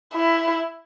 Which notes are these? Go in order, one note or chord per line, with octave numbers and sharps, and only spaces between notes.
E4